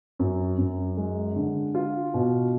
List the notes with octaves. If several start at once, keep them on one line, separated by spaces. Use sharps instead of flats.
F#2
F#2
G#3
D3
F4
B2